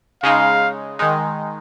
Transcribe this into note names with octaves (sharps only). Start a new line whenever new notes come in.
C#3 G#3 D#4 F5
D#3 G#3 D#4